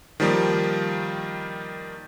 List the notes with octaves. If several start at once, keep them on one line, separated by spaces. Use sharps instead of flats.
D#3 F3 G3 A#3